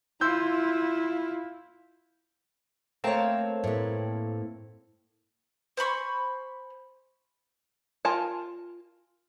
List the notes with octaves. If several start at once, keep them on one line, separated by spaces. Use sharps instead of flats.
E4 F4 C6 E6 G6
A3 A#3 C4 C#5 A5
A2 B4
C5 G#5 B5 C#6
F4 A#4 G#5 A5